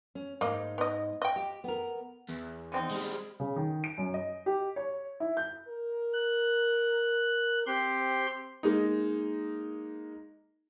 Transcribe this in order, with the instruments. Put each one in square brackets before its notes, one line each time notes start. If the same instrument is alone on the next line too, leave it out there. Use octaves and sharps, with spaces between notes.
[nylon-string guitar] C#4
[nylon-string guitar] G#2 D#4 [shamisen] A#3 D#5
[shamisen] B3 D#5
D#5 G5
[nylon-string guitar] G4
B3 A#4
[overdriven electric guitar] E2
[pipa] D3 C4 D#4
[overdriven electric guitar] G3 G#3
[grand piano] C#3
D#3
D7
F#2
D#5
G4
C#5
E4
G6
[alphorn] A#4
[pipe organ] F#6
[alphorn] C4 [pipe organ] G4 C6
[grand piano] G#3 A#3 D#4